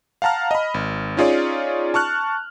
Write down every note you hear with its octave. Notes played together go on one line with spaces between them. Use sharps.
F5 F#5 A5 A#5 F6
D#5 B5
G#1
C#4 D#4 F4 G#4 C#5 D5
A5 C#6 F6 F#6